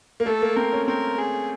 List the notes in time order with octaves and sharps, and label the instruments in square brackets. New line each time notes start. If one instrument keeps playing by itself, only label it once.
[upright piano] A#3
[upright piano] A3 [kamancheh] A4
[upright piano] A#3
[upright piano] C4 [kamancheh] A#4
[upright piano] C#4
[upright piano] C4 [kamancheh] A#4
[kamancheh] G#4